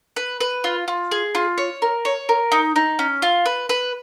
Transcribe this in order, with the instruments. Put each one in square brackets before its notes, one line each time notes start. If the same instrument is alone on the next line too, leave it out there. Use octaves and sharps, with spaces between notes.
[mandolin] B4
B4
F4
F4
G#4
F4
C#5
A#4
C#5
A#4
D#4
D#4
C#4
F4
B4
B4